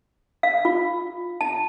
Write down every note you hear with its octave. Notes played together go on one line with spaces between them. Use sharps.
F5
F4
A5